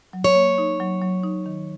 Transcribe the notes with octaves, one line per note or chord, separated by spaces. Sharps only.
F#3
C#5
A#3
D#4
F#3
F#3
D#4
D#3